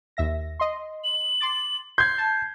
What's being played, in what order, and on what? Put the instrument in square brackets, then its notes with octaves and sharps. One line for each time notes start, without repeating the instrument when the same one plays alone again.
[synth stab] D#2 E5 A#6
D#5 C6
[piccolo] F#7
[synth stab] C6 D6 A6
[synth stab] C6 [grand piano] G6 G#6 [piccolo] C7
[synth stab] A5